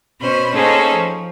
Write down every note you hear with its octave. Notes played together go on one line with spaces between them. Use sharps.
B2 B3 C#4 C5 B5
A#3 C#4 D#4 G#4 A4 C5
F3